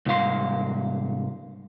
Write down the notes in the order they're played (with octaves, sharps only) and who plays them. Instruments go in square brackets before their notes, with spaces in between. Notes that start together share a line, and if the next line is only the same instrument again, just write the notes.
[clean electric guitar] C2 G#2 F5 C6